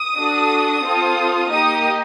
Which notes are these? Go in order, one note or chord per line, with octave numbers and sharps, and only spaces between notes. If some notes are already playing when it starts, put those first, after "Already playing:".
Already playing: D#6
D4 F#4 A4
C4 F4 A4
A#3 D#4 G4 D#6